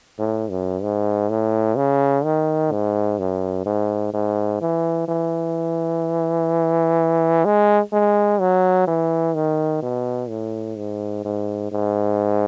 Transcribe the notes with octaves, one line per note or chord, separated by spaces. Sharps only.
A2
F#2
G#2
A2
C#3
D#3
G#2
F#2
G#2
G#2
E3
E3
G#3
G#3
F#3
E3
D#3
B2
A2
G#2
G#2
G#2